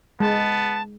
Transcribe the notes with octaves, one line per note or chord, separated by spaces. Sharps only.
G#3 B3 A5